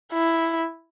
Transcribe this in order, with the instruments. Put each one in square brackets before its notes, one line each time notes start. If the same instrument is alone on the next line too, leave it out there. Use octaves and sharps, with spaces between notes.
[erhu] E4